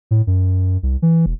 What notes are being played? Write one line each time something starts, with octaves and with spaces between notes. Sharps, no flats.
A2
F#2
C2
E3
E1